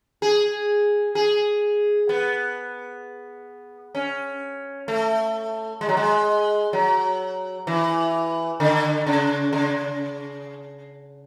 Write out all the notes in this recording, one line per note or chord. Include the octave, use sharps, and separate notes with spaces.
G#4
G#4
B3
C#4
A3
G#3
F#3
G#3
F#3
E3
D3
C#3
C#3